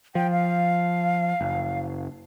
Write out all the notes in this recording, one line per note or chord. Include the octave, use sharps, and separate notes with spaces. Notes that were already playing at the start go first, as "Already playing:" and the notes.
F3 G5
F5
F#1